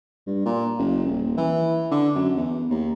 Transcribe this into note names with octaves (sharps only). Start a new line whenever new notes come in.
G2
A#2
F#1
D#1
E3
D3
F#2
E2
D#2